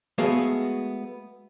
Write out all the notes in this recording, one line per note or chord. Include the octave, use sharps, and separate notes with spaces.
G#3 A3 B3 F#4 G#4 F5